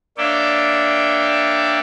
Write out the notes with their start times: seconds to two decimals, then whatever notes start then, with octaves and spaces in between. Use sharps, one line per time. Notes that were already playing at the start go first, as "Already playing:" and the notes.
0.18 A#3 D4 C#5 D5 E5 G5